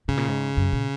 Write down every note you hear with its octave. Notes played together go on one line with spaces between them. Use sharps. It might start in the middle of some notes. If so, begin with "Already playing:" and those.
G#2 C#3
A#2
G#2
F#2
A#2